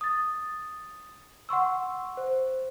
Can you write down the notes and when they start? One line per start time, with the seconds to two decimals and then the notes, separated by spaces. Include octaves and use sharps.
0.01 D#6 A6
1.49 F#5 C6 C#6 E6
2.17 C5